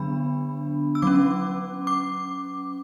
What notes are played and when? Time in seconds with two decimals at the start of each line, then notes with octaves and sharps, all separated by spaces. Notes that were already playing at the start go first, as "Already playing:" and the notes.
Already playing: D3 F#3 B3 D4 B5
0.95 E6
1.02 F#3 C#4 D6
1.87 D6